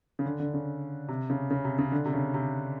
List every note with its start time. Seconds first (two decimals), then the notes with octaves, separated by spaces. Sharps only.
0.19 C#3
0.26 D3
0.40 D3
0.54 C#3
1.08 C3
1.30 C#3
1.50 C#3
1.65 C3
1.78 C#3
1.92 D3
2.06 C3
2.13 C#3
2.34 C3